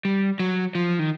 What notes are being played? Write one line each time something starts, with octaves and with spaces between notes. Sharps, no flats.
G3
F#3
F3
D#3